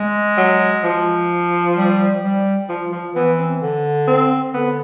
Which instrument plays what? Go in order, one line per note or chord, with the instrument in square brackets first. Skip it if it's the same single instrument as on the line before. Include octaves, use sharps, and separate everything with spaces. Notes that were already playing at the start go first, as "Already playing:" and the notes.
Already playing: [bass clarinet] G#3
[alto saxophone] F#3
F3
[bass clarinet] G3
G3
[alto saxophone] F3
F3
[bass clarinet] E3 [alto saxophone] B3
[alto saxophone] C4
[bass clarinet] D3
[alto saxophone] C4
[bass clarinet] D3 [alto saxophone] B3